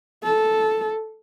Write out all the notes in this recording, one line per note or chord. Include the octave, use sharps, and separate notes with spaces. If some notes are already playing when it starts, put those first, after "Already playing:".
A4